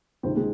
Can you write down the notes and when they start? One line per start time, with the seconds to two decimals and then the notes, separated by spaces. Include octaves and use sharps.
0.23 C#2 C3 D#3 C4
0.36 G#3